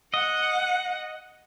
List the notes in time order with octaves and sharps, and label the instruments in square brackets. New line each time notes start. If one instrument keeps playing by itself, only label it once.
[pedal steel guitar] D#5 [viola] F#5